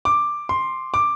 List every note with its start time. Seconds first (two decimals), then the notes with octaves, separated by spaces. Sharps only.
0.05 D6
0.49 C6
0.94 D6